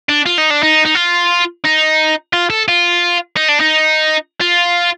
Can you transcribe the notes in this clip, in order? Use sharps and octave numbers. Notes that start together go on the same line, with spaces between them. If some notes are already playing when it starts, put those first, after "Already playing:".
D4
F4
D#4
D4
D#4
D#4
F4
D#4
F4
A4
F4
D#4
D4
D#4
F4